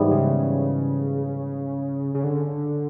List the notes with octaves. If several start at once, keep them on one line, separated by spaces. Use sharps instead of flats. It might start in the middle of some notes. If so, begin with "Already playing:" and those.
Already playing: G#2 E3 G3 B3
C#3
C#3
D3